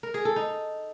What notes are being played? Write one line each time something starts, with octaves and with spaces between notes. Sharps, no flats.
A#4
G#4
A4
D#4